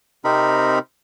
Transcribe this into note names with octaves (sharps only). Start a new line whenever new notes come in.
C3 C4 D#4 A#4 B5